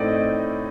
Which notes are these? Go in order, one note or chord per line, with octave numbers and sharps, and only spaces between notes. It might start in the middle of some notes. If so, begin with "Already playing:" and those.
Already playing: A2 A3 C4 D#4 D5
D#5